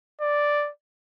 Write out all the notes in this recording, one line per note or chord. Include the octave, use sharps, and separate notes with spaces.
D5